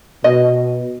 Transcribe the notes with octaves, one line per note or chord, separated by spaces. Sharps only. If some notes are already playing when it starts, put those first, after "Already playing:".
B2 D#5